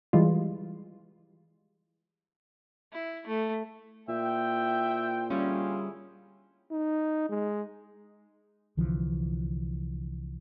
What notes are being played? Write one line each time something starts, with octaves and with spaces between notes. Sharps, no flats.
E3 G3 G#3 F4
E4
A3
A#2 E4 C5 E5 G5
D3 G3 C#4 E4 F4 G#4
D#4
G#3
C2 D3 E3 F3